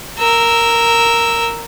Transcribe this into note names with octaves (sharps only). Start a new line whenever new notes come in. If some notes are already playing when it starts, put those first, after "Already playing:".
A#4 E6